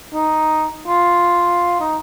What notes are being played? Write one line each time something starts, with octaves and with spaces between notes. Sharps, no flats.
D#4
F4
D#4